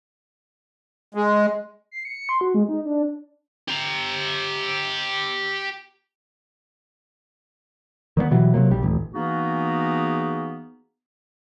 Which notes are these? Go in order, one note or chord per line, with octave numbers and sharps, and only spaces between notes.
G#3
C7
C#7
C6
F#4
G#3
D#4
D4
G4 A#5
D#3 G3 G#3 B3
B2 E3 F#3 G3
C3 F#3 A#3
B1 G3
D#1 A1
E3 A#3 B3 D#4 F#4 G#4